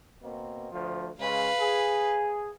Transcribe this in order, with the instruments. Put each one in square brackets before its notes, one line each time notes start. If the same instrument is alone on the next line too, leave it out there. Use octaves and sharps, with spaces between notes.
[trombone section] B2 A#3 C4
D2 F3
[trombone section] C#3 G#3 [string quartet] B4 F5
[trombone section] G#4